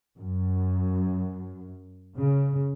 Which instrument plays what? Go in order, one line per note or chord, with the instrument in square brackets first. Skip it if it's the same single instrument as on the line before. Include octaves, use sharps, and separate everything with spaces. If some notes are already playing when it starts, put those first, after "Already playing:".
[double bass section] F#2
C#3